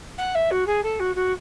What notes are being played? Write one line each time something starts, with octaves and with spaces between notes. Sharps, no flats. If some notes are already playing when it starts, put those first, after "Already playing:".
F#5
E5
F#4
G#4
A4
F#4
F#4